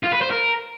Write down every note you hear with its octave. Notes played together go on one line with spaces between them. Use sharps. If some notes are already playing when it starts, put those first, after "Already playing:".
F4
B4
C5
A#4